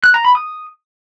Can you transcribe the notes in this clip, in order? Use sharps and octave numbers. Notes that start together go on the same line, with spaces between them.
F#6
A#5
B5
D#6